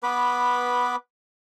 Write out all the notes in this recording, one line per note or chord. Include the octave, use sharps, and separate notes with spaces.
B3 B4 B5 D6